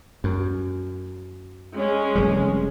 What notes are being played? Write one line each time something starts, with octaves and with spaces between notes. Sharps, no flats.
F#2
G#3 C#4
F1 G3